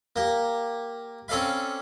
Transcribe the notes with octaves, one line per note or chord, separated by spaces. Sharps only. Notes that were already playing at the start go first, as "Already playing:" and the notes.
A#3 G4
C4 C#4 A4 D5 F5 B5